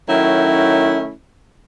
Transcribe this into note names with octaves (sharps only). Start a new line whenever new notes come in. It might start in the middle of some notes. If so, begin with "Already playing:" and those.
D#3 F#3 A3 C#4 E4